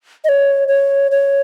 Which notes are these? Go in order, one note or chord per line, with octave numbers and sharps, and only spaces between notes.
D#5
C#5
C#5
C#5